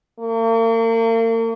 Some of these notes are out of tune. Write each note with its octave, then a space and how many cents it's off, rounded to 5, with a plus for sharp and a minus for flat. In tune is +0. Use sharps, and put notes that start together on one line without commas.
A#3 -40